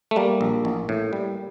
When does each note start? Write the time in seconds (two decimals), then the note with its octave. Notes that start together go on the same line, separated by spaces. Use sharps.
0.11 A3
0.16 G3 A#3
0.41 A#1
0.65 A1
0.89 A2
1.13 G3